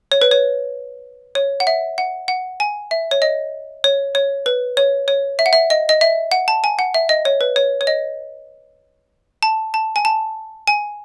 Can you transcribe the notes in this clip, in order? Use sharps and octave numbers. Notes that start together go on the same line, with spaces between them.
C#5
B4
C#5
C#5
F#5
E5
F#5
F#5
G#5
E5
C#5
D#5
C#5
C#5
B4
C#5
C#5
E5
F#5
E5
D#5
D#5
E5
F#5
A5
G#5
F#5
E5
D#5
C#5
B4
C#5
C#5
D#5
A5
A5
G#5
A5
G#5